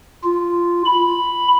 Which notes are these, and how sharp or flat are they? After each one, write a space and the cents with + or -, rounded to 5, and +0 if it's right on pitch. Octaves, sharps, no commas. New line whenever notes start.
F4 -10
B5 +0